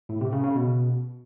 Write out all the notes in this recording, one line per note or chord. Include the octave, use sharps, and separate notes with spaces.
A2
C3
C#3
C#3
B2